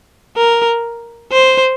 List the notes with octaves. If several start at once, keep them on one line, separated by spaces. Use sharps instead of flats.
A#4
C5